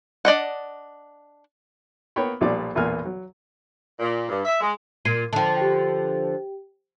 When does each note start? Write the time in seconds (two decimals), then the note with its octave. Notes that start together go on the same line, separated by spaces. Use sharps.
0.25 D4 D5 D#5 F#5
2.16 A#3 B3 C#5 G5 B5
2.41 B1 A#2 F3 G3 D5 D6
2.75 B1 E2 A#2 A#3 G#5 F6
3.05 F#3
4.00 A#2
4.29 G2
4.45 E5
4.60 G#3
5.05 A#2 G#6 C7 D#7
5.33 D3 F3 G5 A5
5.57 G4 G5